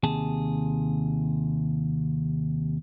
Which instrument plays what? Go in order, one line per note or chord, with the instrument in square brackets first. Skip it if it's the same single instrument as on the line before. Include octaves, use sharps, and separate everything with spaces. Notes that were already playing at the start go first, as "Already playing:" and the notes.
[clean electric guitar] D#2 C3 G#4 A5